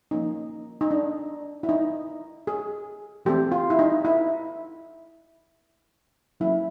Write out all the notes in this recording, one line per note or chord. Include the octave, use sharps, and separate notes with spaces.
F3 A#3 C#4 D#4
D#4
D4
E4
D#4
G#4
E3 A3 C4 G4
F4
E4
D#4
E4
F#3 A#3 C#4 E4